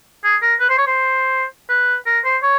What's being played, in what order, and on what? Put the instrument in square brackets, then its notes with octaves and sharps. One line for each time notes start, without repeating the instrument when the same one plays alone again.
[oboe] G#4
A#4
B4
C5
C#5
C5
B4
A#4
C5
C#5